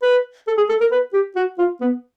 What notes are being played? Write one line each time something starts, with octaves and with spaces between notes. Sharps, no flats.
B4
A4
G#4
A4
A#4
B4
G4
F#4
F4
B3